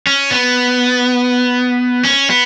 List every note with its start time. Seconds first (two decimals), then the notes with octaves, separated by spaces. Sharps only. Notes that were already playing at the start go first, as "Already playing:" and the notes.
0.07 C#4
0.31 B3
2.05 C#4
2.30 B3